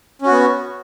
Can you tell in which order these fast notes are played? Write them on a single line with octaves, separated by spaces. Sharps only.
C#4 F#4 B3